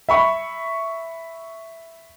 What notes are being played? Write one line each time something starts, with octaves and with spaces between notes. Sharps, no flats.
E5 B5 C#6